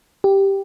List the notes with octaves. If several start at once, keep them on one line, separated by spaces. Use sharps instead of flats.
G4